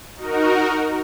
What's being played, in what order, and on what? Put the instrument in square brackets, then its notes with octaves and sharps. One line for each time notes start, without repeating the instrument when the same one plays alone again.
[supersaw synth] D#4 F#4 A#4